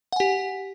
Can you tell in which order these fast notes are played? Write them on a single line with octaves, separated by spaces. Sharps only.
F#5 G#5 G4